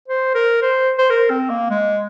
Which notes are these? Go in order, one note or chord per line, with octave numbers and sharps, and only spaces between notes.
C5
A#4
C5
C5
A#4
C4
A#3
G#3